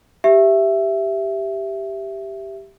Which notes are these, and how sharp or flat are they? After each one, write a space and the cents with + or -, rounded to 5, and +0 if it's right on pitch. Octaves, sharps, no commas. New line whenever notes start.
G4 +0 E5 +10